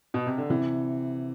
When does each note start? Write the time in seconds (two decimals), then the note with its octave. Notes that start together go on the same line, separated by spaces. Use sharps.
0.14 B2
0.26 C3
0.38 D3
0.50 C3 E3